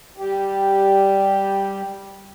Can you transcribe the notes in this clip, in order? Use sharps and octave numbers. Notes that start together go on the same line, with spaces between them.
G3 G4